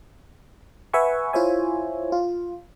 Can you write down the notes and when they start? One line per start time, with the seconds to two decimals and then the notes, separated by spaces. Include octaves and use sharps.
0.93 B4 E5 F#5 G#5 C#6
1.33 E4 F4 C5 C#5 E5 G#5
2.12 F4